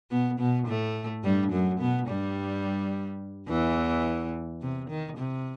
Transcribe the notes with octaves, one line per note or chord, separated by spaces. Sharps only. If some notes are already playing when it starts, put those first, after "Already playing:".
B2 B3
B2 B3
A2 A3
G2 G3
F#2 F#3
B2 B3
G2 G3
E2 E3
C3
D#3
C3